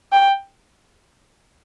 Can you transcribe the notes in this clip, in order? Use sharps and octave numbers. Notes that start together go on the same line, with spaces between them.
G5